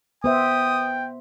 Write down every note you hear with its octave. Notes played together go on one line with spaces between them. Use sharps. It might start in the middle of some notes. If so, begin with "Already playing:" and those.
B3 C5 E5 G5 D#6